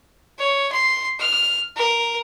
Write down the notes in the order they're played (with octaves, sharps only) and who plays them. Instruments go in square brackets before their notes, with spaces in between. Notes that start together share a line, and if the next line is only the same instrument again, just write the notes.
[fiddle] C#5
C6
F6
A#4